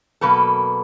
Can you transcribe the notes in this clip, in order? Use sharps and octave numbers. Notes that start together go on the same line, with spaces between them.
B2 F#3 A#3 A4 B4